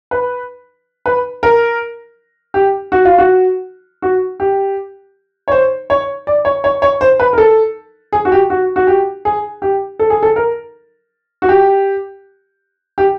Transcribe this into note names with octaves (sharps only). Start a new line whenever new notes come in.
B4
B4
A#4
G4
F#4
F4
F#4
F#4
G4
C#5
C5
C#5
D5
C#5
C#5
C#5
C5
B4
A#4
A4
G#4
F#4
G4
F#4
F#4
G4
G#4
G4
A4
G#4
A4
A#4
F#4
G4
G4